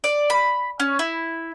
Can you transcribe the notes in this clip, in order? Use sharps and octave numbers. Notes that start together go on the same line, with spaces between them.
D5
B5
C#4
E4